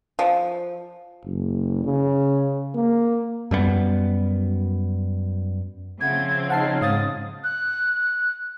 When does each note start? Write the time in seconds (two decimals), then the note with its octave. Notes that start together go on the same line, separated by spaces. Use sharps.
0.19 F3
1.24 F#1
1.85 C#3
2.75 A#3
3.51 F#2 G3 G#3 B3
6.00 C#3 F3 C4 E5 F#5 B5 G#6
6.50 D#4 C#5 F#5 A5 F6 C7
6.82 G#2 F5 D#6 A6
7.43 F#6